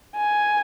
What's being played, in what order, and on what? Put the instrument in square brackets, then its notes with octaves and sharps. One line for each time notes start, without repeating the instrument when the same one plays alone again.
[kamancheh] G#5